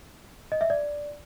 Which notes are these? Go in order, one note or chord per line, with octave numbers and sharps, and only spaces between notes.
D#5
E5
D5